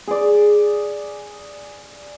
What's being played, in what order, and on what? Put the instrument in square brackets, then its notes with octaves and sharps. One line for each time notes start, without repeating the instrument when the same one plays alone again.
[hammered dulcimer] G#4 D5